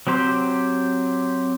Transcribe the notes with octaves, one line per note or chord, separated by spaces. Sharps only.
F#3 C4 G4 C5